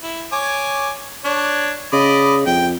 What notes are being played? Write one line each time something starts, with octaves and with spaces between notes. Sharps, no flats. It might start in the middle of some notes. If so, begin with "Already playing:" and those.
E4
C#5 G#5 D6
D4 C#5
C#3 D5 D#5 B5
F2 G5